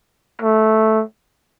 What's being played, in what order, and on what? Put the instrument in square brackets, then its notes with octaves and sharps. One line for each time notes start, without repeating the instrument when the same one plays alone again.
[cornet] A3